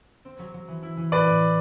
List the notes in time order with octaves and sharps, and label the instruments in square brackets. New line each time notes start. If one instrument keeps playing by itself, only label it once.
[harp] C4
F#3
F#3
E3
E4
E3
[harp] A2 [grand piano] B4 D5
[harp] A2
F#3